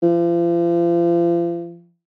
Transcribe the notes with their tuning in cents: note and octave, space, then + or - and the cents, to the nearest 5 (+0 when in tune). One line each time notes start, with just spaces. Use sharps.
F3 -40